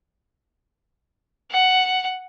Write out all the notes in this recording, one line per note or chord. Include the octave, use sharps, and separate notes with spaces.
F#5